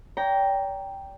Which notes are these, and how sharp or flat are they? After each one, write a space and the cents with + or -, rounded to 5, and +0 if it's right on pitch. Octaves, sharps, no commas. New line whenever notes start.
D5 -40 G5 +0 A#5 +5